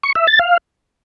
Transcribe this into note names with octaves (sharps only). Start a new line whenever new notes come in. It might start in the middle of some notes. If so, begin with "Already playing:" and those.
C#6
E5
A6
F5